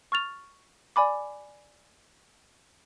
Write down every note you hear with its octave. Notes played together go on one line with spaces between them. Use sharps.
C#6 F6 A6 F7
D5 G#5 B5 D6